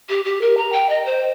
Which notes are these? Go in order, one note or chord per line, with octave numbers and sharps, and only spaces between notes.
G4
G4
A#4
A#5
G5
D#5
C5